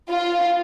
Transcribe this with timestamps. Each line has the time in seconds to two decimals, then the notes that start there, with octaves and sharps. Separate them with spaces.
0.11 F4